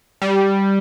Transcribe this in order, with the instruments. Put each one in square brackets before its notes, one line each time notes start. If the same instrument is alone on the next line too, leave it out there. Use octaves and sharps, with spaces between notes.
[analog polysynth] G3